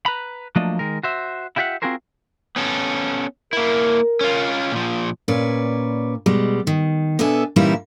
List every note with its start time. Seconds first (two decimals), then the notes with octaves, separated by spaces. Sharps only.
0.06 B4 A#5 B5
0.56 F3 F#3 A3 A#3 D4 D#5
0.79 D#3 G#3 A#4
1.03 F#4 C5 E5
1.56 E4 F4 G4 C#5 E5 F#5
1.82 C4 F4 F#4 G#4 A#4 C5
2.56 B3 C#4 A4
3.53 A#3 E4 A#4
4.21 C#4 F4
4.72 A#2 F3
5.28 A#2 C#4 B4 D5
6.26 B2 G3 G#3
6.67 D#3
7.19 B2 B3 D4 A4 E5 G#5
7.56 A#2 C#3 E3 G3 D#4 E4